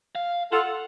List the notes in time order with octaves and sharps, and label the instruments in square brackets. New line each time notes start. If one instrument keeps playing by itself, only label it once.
[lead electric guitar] F5
[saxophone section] F4 A4 [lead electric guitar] F#5